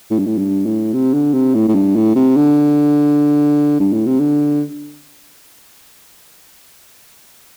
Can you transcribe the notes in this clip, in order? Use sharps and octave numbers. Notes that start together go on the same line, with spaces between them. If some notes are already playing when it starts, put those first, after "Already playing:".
A2
G2
A2
G2
A2
C3
D3
C3
A2
A2
G2
A2
C3
D3
G2
A2
C3
D3